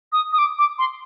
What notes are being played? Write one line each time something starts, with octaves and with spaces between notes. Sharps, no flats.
D#6
D#6
D6
D6
C6